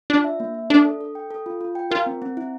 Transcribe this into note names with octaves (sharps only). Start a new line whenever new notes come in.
D4 F4
E5
A#3
E5
D4 A4
A4
A4
G5
A4
F4
F4
G5
F4 A#4
C4
C4
E4